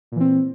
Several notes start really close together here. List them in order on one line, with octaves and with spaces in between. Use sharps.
A#2 E3 C4